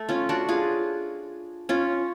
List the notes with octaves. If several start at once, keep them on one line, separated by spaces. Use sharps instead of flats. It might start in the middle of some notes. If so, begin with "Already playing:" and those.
Already playing: A3
C#4 F4
D4 F#4
F4 G#4
C#4 F4